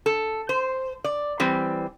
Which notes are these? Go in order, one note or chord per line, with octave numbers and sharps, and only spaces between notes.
A4
C5
D5
E3 G3 C4